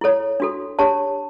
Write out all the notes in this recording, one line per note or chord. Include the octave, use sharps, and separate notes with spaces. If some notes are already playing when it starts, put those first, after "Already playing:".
E4 A4 C#5
D4 F#4 A4
D4 G4 C#5 A5